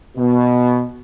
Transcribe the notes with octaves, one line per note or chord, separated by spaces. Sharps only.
B2